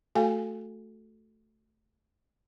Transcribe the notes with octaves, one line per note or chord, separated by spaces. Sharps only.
A3 F#4 A4 F5 G5 G#5